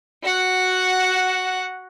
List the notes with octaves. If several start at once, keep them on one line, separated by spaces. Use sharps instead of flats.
F#4 F#5